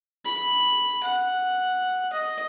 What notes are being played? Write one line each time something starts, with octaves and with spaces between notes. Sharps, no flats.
B5
F#5
D#5